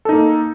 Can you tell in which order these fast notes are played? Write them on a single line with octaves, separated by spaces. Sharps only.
A4 D#4 A#3